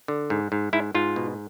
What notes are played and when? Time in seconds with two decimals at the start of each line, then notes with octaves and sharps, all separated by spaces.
0.08 D3
0.30 G#2
0.52 G#2
0.73 G#2 E4
0.94 G#2 F4
1.16 B2